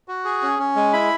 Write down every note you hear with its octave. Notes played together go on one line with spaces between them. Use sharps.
F#4
G#4
C#4
C#4
G#3
E4 B5